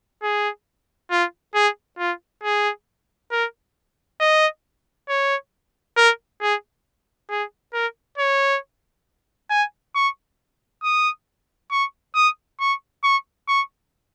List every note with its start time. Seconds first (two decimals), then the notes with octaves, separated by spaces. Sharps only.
0.22 G#4
1.11 F4
1.55 G#4
1.98 F4
2.43 G#4
3.32 A#4
4.20 D#5
5.09 C#5
5.97 A#4
6.41 G#4
7.30 G#4
7.73 A#4
8.18 C#5
9.50 G#5
9.95 C#6
10.83 D#6
11.71 C#6
12.15 D#6
12.60 C#6
13.03 C#6
13.48 C#6